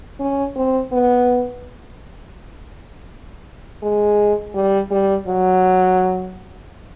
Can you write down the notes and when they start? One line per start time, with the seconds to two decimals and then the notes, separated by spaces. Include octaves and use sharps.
0.20 C#4
0.56 C4
0.92 B3
3.83 G#3
4.55 G3
4.91 G3
5.27 F#3